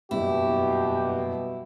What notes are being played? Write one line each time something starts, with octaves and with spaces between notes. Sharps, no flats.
F#1 E2 G2 B2 E4 G4